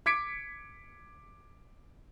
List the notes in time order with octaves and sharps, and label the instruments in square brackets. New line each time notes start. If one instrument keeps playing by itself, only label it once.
[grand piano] D6 G#6 B6 C#7 D7